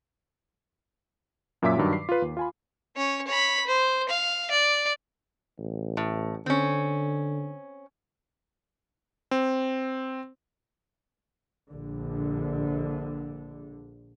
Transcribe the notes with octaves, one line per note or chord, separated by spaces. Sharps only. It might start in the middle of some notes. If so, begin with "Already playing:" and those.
F#2 A#2 F#3 E5 D6 B6
G2 D#3 F#3
C7
F4 B4
D#2
F4 G#5 B5
C#4 C#5
C#5 B5
C5
F5
D5
A1
A2
D3 C4 C#4
C4
A#1 D3